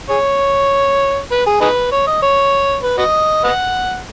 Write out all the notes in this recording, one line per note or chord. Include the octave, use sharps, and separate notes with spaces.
G#4 C#5
B4
G#4
D#4 G#4 B4
C#5
D#5
C#5
B4
F#4 B4 D#5
B4 D#5 F#5